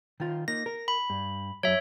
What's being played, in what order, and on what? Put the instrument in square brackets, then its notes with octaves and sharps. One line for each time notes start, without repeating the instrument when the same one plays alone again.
[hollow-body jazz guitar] D#3 F4
[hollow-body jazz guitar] A#3 D#4 [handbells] A#6
[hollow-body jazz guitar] A#4
[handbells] B5
[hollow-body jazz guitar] G2
[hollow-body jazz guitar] F#2 F#3 [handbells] C#5 E5